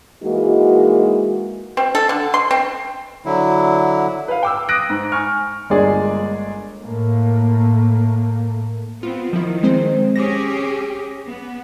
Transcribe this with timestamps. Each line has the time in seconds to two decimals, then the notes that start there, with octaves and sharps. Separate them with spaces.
0.23 E3 G#3 A#3 D#4 F#4
1.77 C4
1.95 A4
2.09 D3
2.34 C6
2.51 C4
3.26 D3 F#3 E4
4.28 B4 F5
4.43 G5 D6 E6
4.69 D#6 F#6 A#6 D7
4.90 G#2
5.12 G#5 C#6 F6
5.70 G1 G#3 A#3 D4 G#4 D5
6.82 A2 A3 A#3
9.03 B3 C4 F4
9.33 D#3 F3 E4
9.63 G#3 C4 C5
10.16 C#4 G4 G#4 D6 A#6
11.27 B3